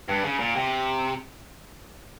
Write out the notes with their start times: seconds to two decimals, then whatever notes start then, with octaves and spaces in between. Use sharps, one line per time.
0.08 G2
0.24 C#3
0.39 A#2
0.56 C3